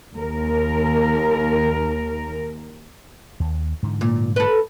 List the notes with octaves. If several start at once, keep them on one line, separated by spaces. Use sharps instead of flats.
D#2 A#4
D#2
G#2 D3 E3
A#2
A4 B4